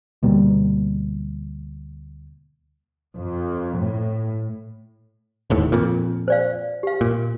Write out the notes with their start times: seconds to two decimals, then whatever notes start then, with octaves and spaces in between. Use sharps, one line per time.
0.23 D2 B2 G3 A#3
3.15 F2
3.78 A2
5.50 E1 D#2 A2
5.72 F2 A#2
6.28 C5 D5 F5
6.83 G4 F5
7.01 A#2